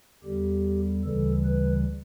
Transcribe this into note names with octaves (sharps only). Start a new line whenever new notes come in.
E2 D3 G3 G4
D2 C#3 E3 G3 A4
B4